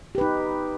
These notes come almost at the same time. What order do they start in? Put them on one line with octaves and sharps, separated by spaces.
G4 B4 D#4